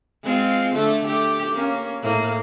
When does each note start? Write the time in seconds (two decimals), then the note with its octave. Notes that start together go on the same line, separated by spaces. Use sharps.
0.24 G#3 C4 F4
0.75 D3 A3 A4
1.06 A3 G4
1.54 A#3 C#4
2.02 A2 A#3